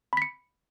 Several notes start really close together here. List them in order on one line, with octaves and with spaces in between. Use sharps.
B5 B6 C#7